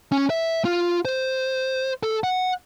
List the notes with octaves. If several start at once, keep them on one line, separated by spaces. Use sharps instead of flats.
C#4
E5
F4
C5
A4
F#5